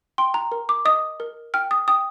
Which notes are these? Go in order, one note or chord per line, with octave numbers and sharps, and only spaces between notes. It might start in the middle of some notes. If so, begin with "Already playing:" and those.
G5 C6
A#5
A#4
D6
D#5 D#6
A#4
G5 F6
D#6
G5 D#6